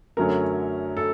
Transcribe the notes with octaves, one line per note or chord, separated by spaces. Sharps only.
F#2 D3 F#3 A3 C#4 A#4
A4